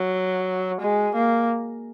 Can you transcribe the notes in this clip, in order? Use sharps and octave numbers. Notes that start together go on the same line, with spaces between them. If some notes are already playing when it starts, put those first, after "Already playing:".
Already playing: F#3
G#3
A#3